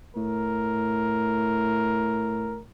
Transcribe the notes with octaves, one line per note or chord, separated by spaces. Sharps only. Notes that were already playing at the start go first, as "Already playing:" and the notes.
A2 A#4